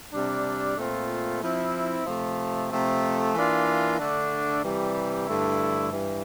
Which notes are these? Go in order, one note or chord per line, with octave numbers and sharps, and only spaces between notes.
C3 G3 D4
A#2 A3 C4 F4
F3 C4 E4
C3 F3 A3
C3 F3 A3
E3 A#3 D4 F4
D3 A3 D4
C3 E3 G3
G2 D3 A3 E4
G2 E3